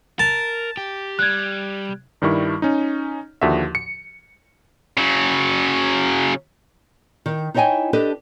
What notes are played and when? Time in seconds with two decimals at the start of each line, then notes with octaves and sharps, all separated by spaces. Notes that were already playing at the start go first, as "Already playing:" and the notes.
0.19 A#4 A5
0.77 G4
1.19 G3 F#6 G#6
2.22 G2 D#3 G3 E4 C#6
2.62 C#4 D#4
3.41 D#2 D3 F3 F#4 E5
3.75 C#7
4.98 C#3 F#3
7.26 D#3
7.54 D#4 E4 C#5 D#5 G5 G#5
7.93 D4 G4 A4 B4 D#5